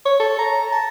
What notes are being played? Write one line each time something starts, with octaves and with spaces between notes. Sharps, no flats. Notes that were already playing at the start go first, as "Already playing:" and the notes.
C#5
A4
A#5
A5